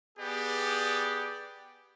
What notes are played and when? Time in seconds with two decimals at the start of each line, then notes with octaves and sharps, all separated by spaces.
0.18 B3 G4 G#4 D5